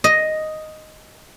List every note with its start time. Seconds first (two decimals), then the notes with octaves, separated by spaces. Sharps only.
0.04 D#5